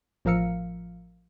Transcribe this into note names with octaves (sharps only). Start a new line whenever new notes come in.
A1 F3 A#4 F5 E6 C#7